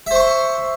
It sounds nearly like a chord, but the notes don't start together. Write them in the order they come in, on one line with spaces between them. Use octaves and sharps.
E5 C5 C#6 C6